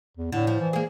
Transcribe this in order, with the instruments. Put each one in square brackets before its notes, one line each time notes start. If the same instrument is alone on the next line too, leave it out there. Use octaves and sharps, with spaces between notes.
[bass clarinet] E2
[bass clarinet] A2 [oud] D3
[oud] F3
[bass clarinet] E3
[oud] A#3 G#4